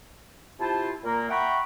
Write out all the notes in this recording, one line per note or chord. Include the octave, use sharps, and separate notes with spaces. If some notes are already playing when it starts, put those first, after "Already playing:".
C3 E4 F4 C5 A5
A#2 A#3 A#4
E5 F#5 G5 A#5 B5 C#6